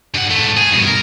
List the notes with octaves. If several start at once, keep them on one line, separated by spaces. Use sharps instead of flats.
G2 F#5
G#2 A3
G#4
G2 B2
A#4